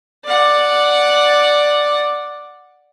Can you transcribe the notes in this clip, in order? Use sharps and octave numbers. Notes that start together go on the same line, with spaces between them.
D5 F#5